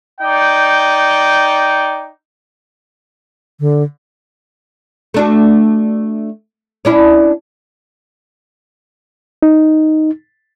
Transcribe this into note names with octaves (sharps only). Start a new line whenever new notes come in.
D#4 D5 G5
D3
A3 D4 F#4
C#4 D4 E4
D#4